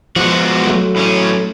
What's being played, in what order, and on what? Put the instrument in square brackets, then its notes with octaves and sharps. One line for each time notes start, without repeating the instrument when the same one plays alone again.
[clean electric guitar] F3 [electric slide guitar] G#3 B3 F#4
[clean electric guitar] F#3 A3
[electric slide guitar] A2 C#4